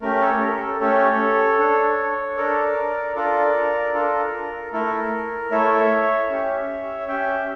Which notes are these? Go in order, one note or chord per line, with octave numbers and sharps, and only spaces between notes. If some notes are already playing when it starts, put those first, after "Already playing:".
A3 C#4 G4 A#4
A4 C#5
A#4
A4
A3 C#4 G4 A4 C#5
D4 A4
D4 A4 A#4 D5
D4 F4 A4 A#4 D5
D4 F4 A4 A#4
A3 E4 A4 A#4
A3 E4 A4 C#5 E5
C#4 G4
C#4 G4 E5 G5